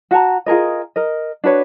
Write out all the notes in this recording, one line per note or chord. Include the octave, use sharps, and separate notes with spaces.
F#4 F#5 A5 A#5
F4 G#4 A#4 D#5
A#4 D#5
D4 F#4 B4 C#5